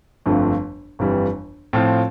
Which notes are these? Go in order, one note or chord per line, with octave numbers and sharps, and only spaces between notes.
G1 F2 D3 F3 A3
G1 F2 E3 G3
A2 F3 C4 F4